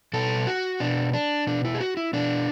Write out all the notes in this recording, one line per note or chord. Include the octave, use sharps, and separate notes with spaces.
B2 A4
F#4
B2 D4
D4
B2 D4
E4
G#4
F#4
E4
B2 D4